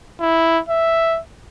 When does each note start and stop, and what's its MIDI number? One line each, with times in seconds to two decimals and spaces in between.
0.20 0.60 64
0.69 1.19 76